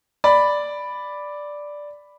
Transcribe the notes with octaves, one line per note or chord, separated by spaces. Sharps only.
D5 B5